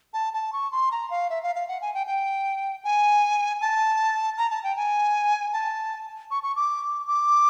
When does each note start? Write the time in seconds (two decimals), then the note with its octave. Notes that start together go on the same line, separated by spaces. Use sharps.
0.14 A5
0.33 A5
0.53 C#6
0.72 C6
0.92 A#5
1.10 F5
1.30 E5
1.43 F5
1.55 F5
1.68 F#5
1.81 G#5
1.94 G5
2.07 G5
2.84 G#5
3.61 A5
4.38 A#5
4.51 A5
4.64 G5
4.76 G#5
5.53 A5
6.31 C#6
6.43 C#6
6.56 D6
7.08 D6